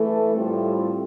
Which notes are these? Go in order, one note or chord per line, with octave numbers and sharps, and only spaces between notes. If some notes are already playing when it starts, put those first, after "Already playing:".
Already playing: E3 A3 E4 A4
A2 G3 C4 F4 A4